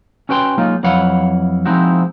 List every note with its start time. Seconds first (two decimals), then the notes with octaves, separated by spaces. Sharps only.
0.29 C#4 F#4 B4 G5 C6
0.58 F#3 G#3 A#3 D#4 F4
0.83 F2 E3 F#3 F5 F#5 B5
1.65 F3 G#3 C4 D#4 E4 F#4